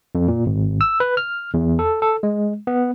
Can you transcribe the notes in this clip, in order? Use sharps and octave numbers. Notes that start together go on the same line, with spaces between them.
F2
A#2
G#1
E6
B4
F6
E2
A4
A4
G#3
B3